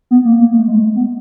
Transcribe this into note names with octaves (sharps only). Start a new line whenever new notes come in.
B3
A#3
A#3
A3
G#3
B3